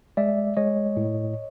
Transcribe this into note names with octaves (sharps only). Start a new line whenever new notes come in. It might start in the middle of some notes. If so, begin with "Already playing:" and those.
G#3 D5 E5
G#3 C#5 D#5
A2